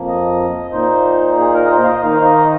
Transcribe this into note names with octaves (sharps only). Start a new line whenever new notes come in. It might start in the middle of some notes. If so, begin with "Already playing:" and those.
Already playing: F2 F3 A#3
D#5
A#2 A#3 D#4 C5
G#4
A#4
D#5
C5
F5
D#5
D#3 A#3 D#4 F5
C5
D#5